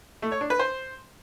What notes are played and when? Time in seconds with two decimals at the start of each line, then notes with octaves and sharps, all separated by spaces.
0.22 A3
0.32 C#5
0.41 D4
0.50 B4
0.59 C5